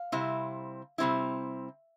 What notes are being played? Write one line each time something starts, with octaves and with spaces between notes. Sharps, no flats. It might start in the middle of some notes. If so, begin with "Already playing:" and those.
Already playing: F5
C3 G3 C4 E4
C3 G3 C4 E4